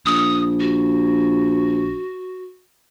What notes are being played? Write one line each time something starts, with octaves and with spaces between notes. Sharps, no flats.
A#1 D#6
F#4